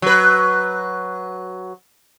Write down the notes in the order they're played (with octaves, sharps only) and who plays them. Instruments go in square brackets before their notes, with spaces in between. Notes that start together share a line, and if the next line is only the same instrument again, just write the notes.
[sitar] F#3 B4